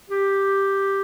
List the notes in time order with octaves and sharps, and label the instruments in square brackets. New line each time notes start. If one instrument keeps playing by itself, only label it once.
[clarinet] G4